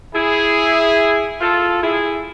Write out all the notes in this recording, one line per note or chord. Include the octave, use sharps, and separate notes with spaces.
E4 G#4
F4 A4
E4 G#4